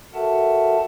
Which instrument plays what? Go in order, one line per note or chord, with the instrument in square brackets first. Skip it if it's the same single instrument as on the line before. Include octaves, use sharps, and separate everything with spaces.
[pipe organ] F#4 A4 A#4 E5 F#5 A5